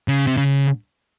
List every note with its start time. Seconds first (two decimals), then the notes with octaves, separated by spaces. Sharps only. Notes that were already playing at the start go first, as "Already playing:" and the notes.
0.08 C#3
0.27 C3
0.37 C#3